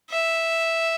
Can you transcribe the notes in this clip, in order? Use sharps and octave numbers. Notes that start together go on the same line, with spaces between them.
E5